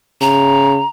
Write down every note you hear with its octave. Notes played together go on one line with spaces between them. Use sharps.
C#3 A#5